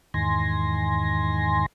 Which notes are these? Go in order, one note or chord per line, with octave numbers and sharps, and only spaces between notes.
E2 G#2 D#3 G#5 C6 A#6